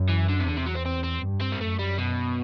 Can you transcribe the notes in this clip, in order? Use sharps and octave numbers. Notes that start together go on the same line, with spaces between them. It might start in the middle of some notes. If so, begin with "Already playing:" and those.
Already playing: F#2
E3
D3
C3
E2 D3
C3
F#3
C4
C4
C4
G2
C4
G3
F#2 A3
G3
B2